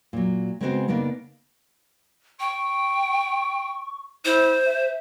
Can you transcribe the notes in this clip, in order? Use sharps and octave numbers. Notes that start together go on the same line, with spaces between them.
A#2 F#3
C#3 G#3 B3 C4 F4 F#4
C#3 A#3 B3 D4 D#4
G5 C#6
E4 C5
E5